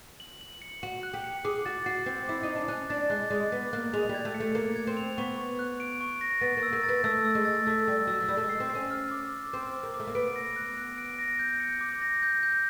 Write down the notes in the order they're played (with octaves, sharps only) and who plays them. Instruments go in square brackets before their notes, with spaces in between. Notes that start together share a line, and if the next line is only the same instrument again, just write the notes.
[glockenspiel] F#7
F#7
C#7
[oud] F#4 [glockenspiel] F#7
[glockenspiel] F#6
[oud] G4
[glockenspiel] C#7
[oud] G#4 [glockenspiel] D6
[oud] F#4 [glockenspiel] A6
[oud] F#4 [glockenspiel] C7
[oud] C4 [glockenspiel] C7
[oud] E4 [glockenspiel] D6
[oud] D#4 [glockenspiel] D6
[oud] D4
[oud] C#4 [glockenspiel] F#6
[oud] D4 [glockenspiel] A6
[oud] G#3 [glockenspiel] F#6
[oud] G#3 [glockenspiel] D6
[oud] B3 [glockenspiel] D6
[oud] A#3 [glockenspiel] F#6
[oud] G#3 [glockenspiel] F7
[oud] G3
[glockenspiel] G#6
[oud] A3
[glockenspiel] C#7
[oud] A3
[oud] A#3 [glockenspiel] C#7
[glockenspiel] G#6
[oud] C4
[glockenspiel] F7
[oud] B3 [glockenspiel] C#6
[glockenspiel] C#6
F#6
D7
C#6
A#6
[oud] B3 [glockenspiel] A6
[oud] A#3
[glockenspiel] E6
[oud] A#3
[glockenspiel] A6
[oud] B3
[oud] A3 [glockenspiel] E6
[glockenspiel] E6
[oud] G#3
[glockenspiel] A6
[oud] A3 [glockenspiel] E6
[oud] G3 [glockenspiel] E6
[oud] F#3 [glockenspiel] E6
[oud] F#3
[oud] G3 [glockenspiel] E6
[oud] A3
G#3
[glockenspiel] C7
[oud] C4
[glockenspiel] C7
[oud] C#4
[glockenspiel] F6
D6
D6
[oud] C4 [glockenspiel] D6
[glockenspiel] D6
[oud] A#3
[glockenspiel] D6
[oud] A3
A#3
[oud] B3 [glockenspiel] D7
[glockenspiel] A#6
F#6
F#6
D7
A#6
G6
C#7
D6
A#6
G6
G6